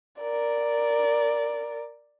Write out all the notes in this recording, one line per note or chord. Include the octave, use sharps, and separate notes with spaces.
A#4 D5